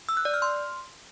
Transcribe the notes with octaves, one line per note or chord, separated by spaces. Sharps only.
E6
F#6
D5
F6
C6